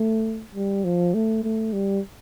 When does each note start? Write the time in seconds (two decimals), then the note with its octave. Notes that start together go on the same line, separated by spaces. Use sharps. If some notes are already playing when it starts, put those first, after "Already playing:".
Already playing: A3
0.55 G3
0.85 F3
1.14 A3
1.44 A3
1.73 G3